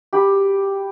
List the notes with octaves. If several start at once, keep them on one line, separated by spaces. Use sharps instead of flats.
G4 B5